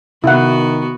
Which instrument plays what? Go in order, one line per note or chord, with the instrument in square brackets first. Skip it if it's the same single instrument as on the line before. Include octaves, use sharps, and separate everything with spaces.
[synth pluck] C3 [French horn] D#3 [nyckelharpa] B3 F#4 [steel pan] E4 F#5